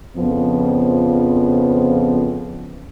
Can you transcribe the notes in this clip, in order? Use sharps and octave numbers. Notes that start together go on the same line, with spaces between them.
F2 C#3 F3 B3